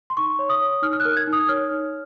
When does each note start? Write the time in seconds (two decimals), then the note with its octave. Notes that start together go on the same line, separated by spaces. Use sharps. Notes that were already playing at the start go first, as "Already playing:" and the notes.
0.10 C6
0.17 D#4 C#6
0.39 C#5
0.49 D#6
0.61 C#5
0.82 D#4 F6
0.93 F6
1.00 F#6
1.05 A#4
1.17 G#6
1.27 D#4
1.33 D#6
1.49 C#5 F6
1.71 D#4